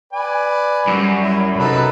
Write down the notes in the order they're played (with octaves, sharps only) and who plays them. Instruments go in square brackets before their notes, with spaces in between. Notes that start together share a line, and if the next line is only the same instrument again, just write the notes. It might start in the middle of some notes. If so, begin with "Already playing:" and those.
[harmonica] B4 D5 G#5
[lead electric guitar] F#2 [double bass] G3
[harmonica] E4
[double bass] C3 D#4 [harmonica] F#4 A4 B4